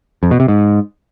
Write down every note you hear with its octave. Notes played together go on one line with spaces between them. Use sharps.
F2
B2
C3
G#2